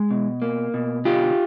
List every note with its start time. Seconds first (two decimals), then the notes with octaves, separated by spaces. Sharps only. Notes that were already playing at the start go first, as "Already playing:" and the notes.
Already playing: G#3
0.11 B2
0.42 A#3
0.74 B2
1.05 D3 F4 G4